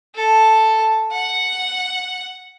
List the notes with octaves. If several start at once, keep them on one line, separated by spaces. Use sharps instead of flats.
A4
F#5